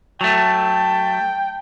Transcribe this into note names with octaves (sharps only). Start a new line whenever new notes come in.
F#3 A3 G5 A5